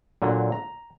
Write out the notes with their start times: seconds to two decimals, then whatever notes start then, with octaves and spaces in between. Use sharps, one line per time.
0.22 A#2 D3 F#3
0.52 A#5